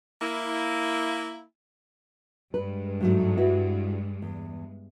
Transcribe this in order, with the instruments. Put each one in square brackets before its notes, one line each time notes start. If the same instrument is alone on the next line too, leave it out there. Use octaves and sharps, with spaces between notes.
[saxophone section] A#3 E4
[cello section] G2 G#3 [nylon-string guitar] B4
[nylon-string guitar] G#2 F#3 A3
E4 F#4 B4
E2